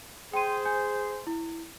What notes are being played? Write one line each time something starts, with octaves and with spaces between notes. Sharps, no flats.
G#4 C5 G5 C6 D#7
G#5 G6
E4